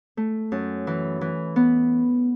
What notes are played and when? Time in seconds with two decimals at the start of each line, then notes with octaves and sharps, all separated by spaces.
0.17 A3
0.52 F#2
0.87 E3
1.21 E3
1.56 B3